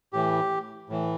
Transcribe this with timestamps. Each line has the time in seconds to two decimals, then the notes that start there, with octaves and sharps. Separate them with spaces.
0.13 A2 E3 G4
0.89 A2 E3